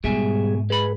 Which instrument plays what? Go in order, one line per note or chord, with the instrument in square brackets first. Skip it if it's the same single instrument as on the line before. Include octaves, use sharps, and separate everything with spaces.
[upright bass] G#2 [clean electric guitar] B2 E5 G#5 [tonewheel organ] G3 G#4
[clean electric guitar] G#3 B5 [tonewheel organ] G#4 B4